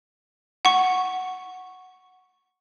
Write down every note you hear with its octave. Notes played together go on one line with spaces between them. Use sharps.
F#5 C#6